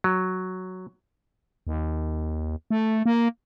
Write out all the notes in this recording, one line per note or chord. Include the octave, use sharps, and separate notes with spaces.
F#3
D#2
A3
A#3